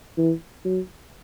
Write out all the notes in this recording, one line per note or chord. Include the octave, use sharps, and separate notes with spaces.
E3
F#3